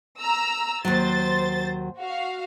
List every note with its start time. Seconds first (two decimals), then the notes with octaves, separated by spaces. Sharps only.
0.20 A#5 E6
0.85 D#2 F#3 C5 A6
1.99 F#4 F5